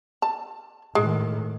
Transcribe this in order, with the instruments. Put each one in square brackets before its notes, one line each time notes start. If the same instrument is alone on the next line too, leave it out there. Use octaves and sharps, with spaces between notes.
[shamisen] A5
[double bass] A2 D#3 [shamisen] G#3